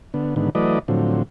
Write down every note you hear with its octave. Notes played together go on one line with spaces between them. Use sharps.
D3 B3
G#2 D3 D#3 B3
E3 F#3 A3 B4 D5 D#5
A2 D3 F3 F#3 C4